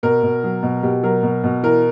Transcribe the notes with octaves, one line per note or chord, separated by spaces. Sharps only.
B2 A#4
B2
F#3
B2
B2 G4
F#3 A#4
B2
B2
E3 A#4